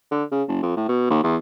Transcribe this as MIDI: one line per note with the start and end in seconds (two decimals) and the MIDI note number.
0.11 0.24 50
0.31 0.43 49
0.48 0.61 30
0.62 0.76 41
0.76 0.85 45
0.88 1.07 47
1.10 1.20 39
1.23 1.36 40